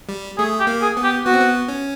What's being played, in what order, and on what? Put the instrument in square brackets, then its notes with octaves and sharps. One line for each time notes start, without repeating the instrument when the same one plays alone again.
[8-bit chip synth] G3
[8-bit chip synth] A3 [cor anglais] G#4
[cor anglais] G4
[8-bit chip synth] A#3
[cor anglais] G#4
[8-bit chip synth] B3
[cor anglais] G4
[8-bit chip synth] B3 [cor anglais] F#4
[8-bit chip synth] C4
B3
C#4